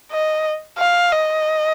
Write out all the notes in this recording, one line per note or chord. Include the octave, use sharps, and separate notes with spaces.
D#5
F5
D#5